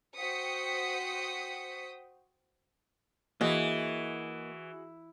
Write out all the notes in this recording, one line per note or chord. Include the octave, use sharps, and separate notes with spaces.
F#4 C5 G5 D#6 B6 C#7
E3 A#3 F#4 G#4 D#5